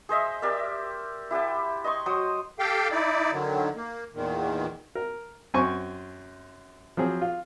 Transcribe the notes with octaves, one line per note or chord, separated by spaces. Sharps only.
G#4 C5 D#5 E5
G4 A#4 D5 E5
E4 G4 F#5 A5
D#5 A#5 C6 C#6
F#3 C5 D#6
G4 A4 F5 G5
D#4 E4 D5
D3 D#3 F#3
A#3
E2 A#2 D#3
A#4
F#2 C4 C5 G#5 C#6
F3 F#3 C4 G#4
F4